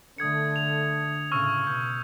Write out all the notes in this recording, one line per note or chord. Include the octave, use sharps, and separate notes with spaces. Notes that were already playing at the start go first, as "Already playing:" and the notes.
D3 A3 D#6 G#6 C#7
F7
A2 C#3 C#6 E6 F6
B2 G6